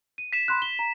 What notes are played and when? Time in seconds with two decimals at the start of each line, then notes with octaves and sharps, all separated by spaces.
0.18 D#7
0.33 B6 E7
0.48 B5 C6 F#6
0.62 G7
0.79 A#5